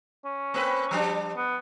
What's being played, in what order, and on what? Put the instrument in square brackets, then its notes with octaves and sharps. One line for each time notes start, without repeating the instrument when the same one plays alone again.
[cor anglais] C#4
[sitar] A#3 C4 B4
F3 G3 D4
[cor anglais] B3